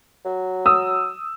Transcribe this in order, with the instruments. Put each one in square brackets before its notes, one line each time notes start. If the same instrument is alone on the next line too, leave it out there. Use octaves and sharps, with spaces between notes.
[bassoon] F#3
[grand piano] D#6 E6